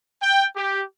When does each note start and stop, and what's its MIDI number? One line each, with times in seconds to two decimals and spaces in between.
0.22 0.43 79
0.56 0.82 67